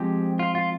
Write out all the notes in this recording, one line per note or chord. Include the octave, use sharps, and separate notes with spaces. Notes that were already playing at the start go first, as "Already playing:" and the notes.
Already playing: F3 G#3 C4 G4
F4
F4